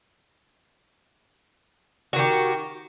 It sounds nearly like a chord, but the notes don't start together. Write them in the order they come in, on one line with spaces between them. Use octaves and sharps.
F#4 D#3 G4